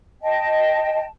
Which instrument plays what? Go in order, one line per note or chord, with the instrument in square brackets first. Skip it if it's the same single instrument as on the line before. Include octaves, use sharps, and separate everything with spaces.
[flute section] D#5 G5 A5